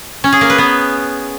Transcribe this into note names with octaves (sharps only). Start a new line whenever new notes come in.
C#4
G#4
A#3
B4
B3